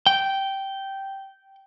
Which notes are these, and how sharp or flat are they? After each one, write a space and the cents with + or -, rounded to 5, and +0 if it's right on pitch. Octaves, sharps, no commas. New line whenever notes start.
G5 -10